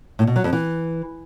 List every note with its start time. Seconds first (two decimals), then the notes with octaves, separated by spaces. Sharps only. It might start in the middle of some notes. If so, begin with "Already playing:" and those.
0.19 A2
0.27 B2
0.36 F#3
0.44 F2
0.53 E3